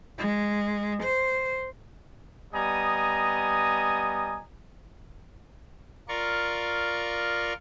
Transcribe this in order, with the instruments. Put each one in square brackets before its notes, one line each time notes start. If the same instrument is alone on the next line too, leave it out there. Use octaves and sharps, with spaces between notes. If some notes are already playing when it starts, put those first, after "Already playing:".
[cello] G#3
C5
[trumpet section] G3 B3 D#5 G#5 A#5 D#6
[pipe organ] F4 A#4 D5 C#6